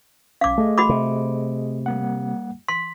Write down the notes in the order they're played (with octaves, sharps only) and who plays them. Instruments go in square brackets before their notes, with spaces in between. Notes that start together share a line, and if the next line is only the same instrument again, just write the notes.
[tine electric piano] B1 C#4 [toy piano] F5 D6
[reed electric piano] A3 [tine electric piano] G#4 D#5
[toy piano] F#4 B5 D6
[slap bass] C3
[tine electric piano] G3 A#3 F#5
[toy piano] C6 [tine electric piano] B6